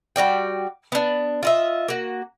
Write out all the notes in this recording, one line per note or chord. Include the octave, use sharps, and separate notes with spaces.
G3 F#4 D5 G5
B3 D4
F4 D#5 E5
A#3 F#4